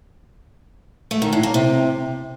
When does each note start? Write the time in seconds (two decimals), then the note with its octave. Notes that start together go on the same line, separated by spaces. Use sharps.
1.11 A3
1.22 D#3
1.32 A2
1.43 A#3
1.54 C3